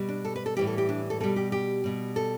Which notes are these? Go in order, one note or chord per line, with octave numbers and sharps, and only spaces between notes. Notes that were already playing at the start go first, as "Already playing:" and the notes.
Already playing: B2 G3
D4
A4
B4
A4
A2 E3 G3 G4
A4
G4
D4
A4
B2 G3 A4
G4
G4
B2 G3
A4